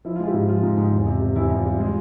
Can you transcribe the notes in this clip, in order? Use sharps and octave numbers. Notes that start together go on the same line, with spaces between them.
F3 E4
G#3 F4
E4 G4
G#2
F3 F4
G#2
G#2
E2
C3
C3
E2 E4 G4
E2
F4
G3
G#3 F4